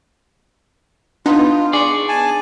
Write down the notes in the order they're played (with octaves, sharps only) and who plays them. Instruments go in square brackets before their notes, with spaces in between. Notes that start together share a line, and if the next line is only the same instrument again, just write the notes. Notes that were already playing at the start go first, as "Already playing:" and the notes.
[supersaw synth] B3 D#4 [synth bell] D4 [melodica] F4
[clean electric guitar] G#4 D5 [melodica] C#6
[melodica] G#5 A5